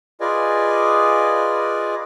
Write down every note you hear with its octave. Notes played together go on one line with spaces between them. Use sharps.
F4 G#4 B4 D5 D#5 G#5